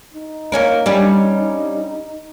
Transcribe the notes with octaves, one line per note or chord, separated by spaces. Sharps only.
D#4
A#3 C#4 A#4
G3 C#4 D4